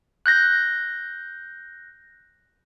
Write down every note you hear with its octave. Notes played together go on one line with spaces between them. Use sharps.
F#6 G6 A#6